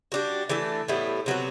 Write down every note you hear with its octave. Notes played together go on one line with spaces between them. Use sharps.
G3 D4 F#4
E3 A3 D4 A4
A2 G3 B3 E4
C3 F#3 B3 F#4